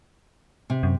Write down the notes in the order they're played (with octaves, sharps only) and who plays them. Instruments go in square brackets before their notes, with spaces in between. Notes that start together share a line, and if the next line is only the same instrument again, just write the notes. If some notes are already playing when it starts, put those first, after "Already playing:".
[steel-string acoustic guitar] C3
[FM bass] F#2